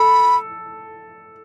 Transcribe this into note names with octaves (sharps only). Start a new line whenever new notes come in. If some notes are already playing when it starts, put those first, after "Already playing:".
Already playing: A4 B5